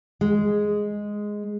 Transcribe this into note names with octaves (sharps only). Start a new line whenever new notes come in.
G#3